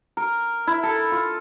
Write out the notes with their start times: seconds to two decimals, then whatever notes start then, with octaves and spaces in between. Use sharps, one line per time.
0.17 A#4
0.67 E4
0.83 A4
1.12 F4